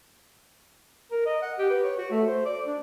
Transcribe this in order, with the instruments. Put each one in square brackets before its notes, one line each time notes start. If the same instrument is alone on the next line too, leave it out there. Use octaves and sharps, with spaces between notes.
[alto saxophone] A#4
D#5
F#5
G4
B4
C#5
F#4
A3
C5
D5
D4